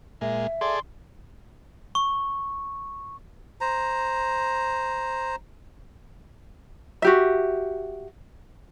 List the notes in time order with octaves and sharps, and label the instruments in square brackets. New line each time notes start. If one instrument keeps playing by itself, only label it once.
[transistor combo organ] A#2 G#3 [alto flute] E5
[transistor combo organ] G#4 A4 D5 [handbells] C6
[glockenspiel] C#6
[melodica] C5 A#5
[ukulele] F#4 G4 E5